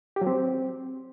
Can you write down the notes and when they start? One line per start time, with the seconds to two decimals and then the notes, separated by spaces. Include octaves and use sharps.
0.16 G4
0.21 F#3
0.27 C4